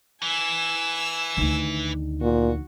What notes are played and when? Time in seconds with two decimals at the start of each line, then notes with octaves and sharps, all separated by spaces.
0.23 E3 G#5 E6
1.37 D2 D#3
2.21 A#2 F#4